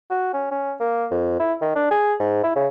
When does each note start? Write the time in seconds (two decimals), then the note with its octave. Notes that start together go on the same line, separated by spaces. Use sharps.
0.10 F#4
0.34 C#4
0.51 C#4
0.80 A#3
1.11 F2
1.40 E4
1.61 D#3
1.75 D4
1.91 G#4
2.20 G#2
2.43 E4
2.56 C#3